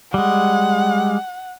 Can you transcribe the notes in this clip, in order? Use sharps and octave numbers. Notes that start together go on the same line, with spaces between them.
G3 G#3 F#5